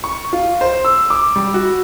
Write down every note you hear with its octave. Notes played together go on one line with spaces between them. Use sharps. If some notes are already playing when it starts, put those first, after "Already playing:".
C#6
F4
C5
E6
D6
G3
F#4